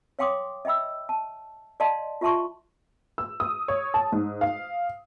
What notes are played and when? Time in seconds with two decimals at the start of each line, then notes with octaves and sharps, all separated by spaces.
0.19 C#5 F5 G5 C6 D6 D#6
0.65 D#5 E5 G5 B5 E6
1.09 A5
1.80 D5 D#5 F5 A5 C6
2.21 F4 G4 E5 A5 C6 C#6
3.18 E6
3.40 D#6
3.68 C#5
3.94 A5
4.12 G#2
4.41 F5